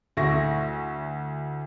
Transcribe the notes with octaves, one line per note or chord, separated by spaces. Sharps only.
D2 A3 E4 C#6 A#6